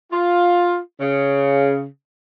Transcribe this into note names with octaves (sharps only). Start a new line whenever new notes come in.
F4
C#3